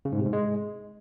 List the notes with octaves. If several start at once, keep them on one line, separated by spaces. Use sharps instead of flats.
C#3
G#2
C3
G#2
G#3